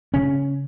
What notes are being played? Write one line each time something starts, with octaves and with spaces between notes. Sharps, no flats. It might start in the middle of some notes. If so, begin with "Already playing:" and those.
C#3 C#4